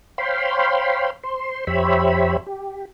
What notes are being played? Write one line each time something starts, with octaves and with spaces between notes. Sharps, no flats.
C5 C#5 F5 G5 B5 C6
C5 C6
F2 G4 C5 C#5 E5 B5
G4